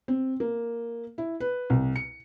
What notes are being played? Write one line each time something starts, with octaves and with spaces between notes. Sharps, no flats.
C4
A#3
E4
B4
C2
C#7